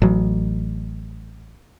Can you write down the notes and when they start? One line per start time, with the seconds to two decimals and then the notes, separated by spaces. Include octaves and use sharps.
0.02 A1 F#3